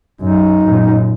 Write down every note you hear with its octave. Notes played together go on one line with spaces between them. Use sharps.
F#2 D#4
F#2 A#2